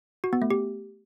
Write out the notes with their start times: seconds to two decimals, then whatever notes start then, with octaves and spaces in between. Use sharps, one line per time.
0.24 F#4
0.33 B3
0.42 A3
0.51 G4